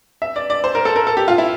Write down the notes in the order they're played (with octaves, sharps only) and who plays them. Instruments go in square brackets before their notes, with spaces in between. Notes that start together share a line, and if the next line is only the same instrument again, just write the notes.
[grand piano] E5
D5
D5
C5
A#4
A4
A#4
A4
G4
F4
E4